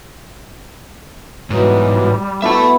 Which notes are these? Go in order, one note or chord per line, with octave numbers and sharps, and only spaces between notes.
G#2 B2 E3 F#3 G3
B3 E4 F#4 A4 E5 A5